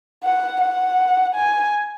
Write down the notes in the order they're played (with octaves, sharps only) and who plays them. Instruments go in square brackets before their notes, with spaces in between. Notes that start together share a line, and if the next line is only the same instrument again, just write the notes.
[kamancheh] F#5
F#5
G#5